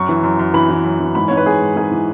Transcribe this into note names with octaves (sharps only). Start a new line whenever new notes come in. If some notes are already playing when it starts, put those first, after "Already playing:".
Already playing: F#2 C#6
E3
F#2
F#2
E3 B5
E3
F#2
E3
G#2 B5
G#2 C#5
B4
G#2 G#4
G#2
G#2 G#4
E3